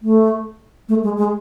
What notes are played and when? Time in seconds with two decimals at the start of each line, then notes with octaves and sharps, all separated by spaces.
0.03 A3
0.89 A3
1.04 G#3
1.18 G#3